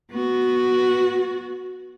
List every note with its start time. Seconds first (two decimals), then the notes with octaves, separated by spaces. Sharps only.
0.11 B3 F#4